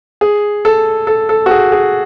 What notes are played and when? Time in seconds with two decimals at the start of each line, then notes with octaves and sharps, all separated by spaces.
0.21 G#4
0.65 A4
1.07 A4
1.29 A4
1.46 F#4
1.51 G#4
1.72 G#4